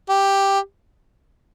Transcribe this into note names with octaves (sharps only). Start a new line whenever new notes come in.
G4